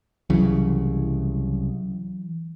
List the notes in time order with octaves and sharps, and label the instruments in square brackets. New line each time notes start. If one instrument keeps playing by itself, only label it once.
[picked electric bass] C2 C#3 [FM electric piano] E3 F#3